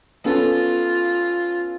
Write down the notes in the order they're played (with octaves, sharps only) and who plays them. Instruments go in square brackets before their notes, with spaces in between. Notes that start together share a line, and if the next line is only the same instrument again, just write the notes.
[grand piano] B3 C#4 A4 [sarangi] F4